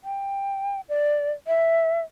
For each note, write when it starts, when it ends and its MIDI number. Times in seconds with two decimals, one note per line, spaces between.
0.04 0.81 79
0.89 1.31 74
1.47 2.01 76